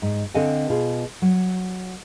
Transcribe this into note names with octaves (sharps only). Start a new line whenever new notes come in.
G#2
D3 C4 A4 D#5 F5 G#5
B2 F4 G#4
F#3